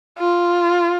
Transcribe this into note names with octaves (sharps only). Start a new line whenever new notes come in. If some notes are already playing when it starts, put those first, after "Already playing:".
F4